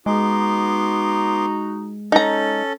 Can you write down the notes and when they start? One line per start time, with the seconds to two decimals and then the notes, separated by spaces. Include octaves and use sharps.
0.06 G#3 B3 D#4 F#4 C6 D6
2.12 C#4 D#4 A4 A#5